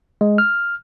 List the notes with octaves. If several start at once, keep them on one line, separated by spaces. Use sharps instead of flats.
G#3
F6